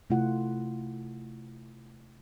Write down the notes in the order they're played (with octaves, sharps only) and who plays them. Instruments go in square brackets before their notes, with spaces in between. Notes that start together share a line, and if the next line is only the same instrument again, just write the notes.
[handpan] C3 A3 E4 F4 F#5